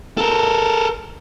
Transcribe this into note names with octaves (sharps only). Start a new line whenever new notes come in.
A4 A#4